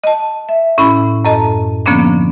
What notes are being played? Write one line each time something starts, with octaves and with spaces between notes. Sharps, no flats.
D#5 A5
E5
A2 C#4 E4 B5 C#6
F#2 A2 A4 D#5 A5 A#5
D3 F3 A#3 B3 C#4 D4